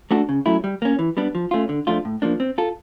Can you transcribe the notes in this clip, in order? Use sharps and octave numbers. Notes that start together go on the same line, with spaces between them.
A3 D4 F#4 A4
C#3
F#3 A3 C#4 E4
G3
A#3 C#4
E3
G3 B3 D4
F3
A3 C#4 F4
D3
F3 A3 D4 F4
A2
F3 A#3 D4
C4
F4 A4